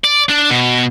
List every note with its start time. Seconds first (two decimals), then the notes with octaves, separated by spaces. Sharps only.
0.05 D5
0.30 D4
0.50 B2